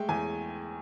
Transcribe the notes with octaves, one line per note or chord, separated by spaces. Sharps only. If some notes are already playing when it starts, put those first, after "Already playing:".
Already playing: G#3 A3 G5
E2 G#5